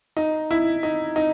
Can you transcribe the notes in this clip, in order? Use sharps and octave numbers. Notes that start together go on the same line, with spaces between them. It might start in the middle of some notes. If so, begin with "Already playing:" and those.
D#4
E4
D#4
D#4